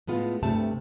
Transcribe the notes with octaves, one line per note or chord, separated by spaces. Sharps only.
A2 G#3 B3 F4
D2 G2 C3 A3 A5